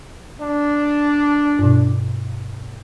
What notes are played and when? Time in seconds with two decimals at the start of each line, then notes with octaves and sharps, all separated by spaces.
0.40 D4
1.59 G2 B2